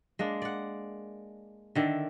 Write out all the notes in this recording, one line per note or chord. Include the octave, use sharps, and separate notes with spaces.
G#3 A#3 D4
D5 F#5
D3 D#3 D5 E5